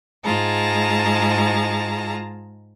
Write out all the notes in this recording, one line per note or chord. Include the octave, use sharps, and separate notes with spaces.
G#2 G#3 F4 G#4 A5 A#5